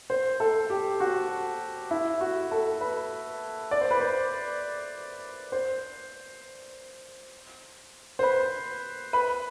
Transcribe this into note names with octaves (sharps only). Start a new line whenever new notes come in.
C5
A4
G4
F#4
E4
F#4
A4
B4
D5
C5
B4
C5
C5
C5
B4
B4